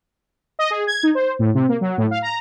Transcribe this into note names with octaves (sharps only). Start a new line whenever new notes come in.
D#5
G#4
G#6
D#4
C5
A2
C3
A#3
F#3
A2
F5
A#5